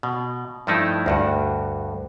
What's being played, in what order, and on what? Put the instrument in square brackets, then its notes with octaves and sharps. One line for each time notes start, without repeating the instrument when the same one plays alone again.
[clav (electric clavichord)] B2
G2 F3 A3 D#4 E4
D2 G2 F#4